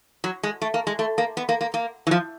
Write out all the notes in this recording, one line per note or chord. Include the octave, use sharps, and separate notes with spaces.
F#3
G#3
A3
A#3
G#3
A3
A#3
B3
A#3
A#3
A#3
E3
F3